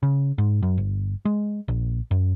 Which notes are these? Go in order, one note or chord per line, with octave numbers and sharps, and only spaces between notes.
C#3
G#2
F#2
G1
G#3
A#1
F#2